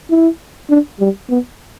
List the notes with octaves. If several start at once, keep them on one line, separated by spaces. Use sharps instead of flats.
E4
D4
G3
B3